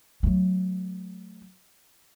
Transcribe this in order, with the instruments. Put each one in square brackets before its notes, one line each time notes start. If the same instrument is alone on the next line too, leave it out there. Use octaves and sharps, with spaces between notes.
[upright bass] F#3 A3